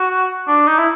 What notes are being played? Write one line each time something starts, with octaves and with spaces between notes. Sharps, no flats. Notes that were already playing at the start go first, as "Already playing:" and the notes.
Already playing: F#4
D4
D#4
E4